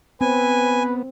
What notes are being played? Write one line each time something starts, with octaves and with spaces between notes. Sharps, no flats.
B3 C4 B4 G#5